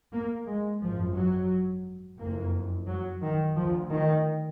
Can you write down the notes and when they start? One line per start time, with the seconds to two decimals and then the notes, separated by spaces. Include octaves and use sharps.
0.12 A#3
0.46 G#3
0.81 G#1 F#2 F3
1.15 F#3
2.18 F#1 F2 A#3
2.87 F#3
3.21 D#3
3.57 D2 F3
3.90 D#3